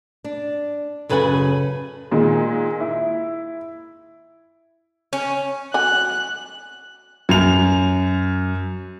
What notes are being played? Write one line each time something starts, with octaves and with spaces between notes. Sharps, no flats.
D4
F#2 C#3 A4 B4 F#5 G#5
A#2 D#3 G#3
E4
C#4
F#3 F#4 G#5 F#6
F#2 F7